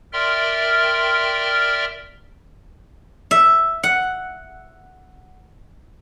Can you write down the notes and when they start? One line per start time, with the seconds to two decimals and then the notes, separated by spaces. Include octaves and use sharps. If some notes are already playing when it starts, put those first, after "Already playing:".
0.13 A#4 D5 E5 G5 C6 F6
3.31 E5
3.83 F#5